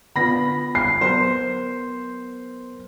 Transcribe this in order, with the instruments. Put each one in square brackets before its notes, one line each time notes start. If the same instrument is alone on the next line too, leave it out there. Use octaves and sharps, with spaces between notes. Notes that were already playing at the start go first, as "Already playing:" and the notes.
[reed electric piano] D3 B3 F4 [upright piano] B5 A#6
[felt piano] C7
[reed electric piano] F#3 B3 A#4 [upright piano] C5